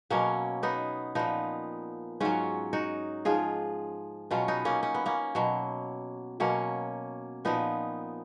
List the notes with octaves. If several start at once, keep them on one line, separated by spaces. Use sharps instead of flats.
B2 F#3 A#3 C#4
B3 D#4
A#2 F3 B3 D#4
G#2 F#3 C#4 F4
D#4 F#4
G#2 F3 F4 G#4
B2 F#3 C#4 F4
B3 D#4
A#3 C#4
C#4
B3
A#3 C#4
B2 F#3
B2 F#3 A#3 C#4
A#2 F3 B3 D#4